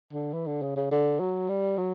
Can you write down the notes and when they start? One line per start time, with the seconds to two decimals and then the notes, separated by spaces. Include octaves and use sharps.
0.13 D3
0.33 E3
0.47 D3
0.62 C#3
0.76 C#3
0.91 D3
1.20 F#3
1.49 G3
1.78 F#3